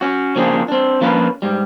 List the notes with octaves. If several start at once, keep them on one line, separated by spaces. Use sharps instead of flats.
C#4 F#4
C#3 F3 A#3 C4 D4 G#4
C4 D4
F3 A#3 C#4 D4 F4 B4
G#2 G3